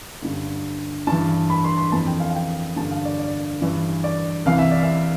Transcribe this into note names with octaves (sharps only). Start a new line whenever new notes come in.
G2 D3
G2 E3 A5
B5
C6
C6
F2 E3 A5
G5
F5
F5
G5
G2 D3 A5
F5
D5
D5
G2 E3
D5
C2 C3 E3 F5
E5
D5
E5